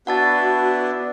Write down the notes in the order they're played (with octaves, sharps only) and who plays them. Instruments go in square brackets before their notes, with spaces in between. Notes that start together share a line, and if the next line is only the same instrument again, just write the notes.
[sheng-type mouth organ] B3 D4 E4 [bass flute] F#4 [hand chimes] F#5 A5 A6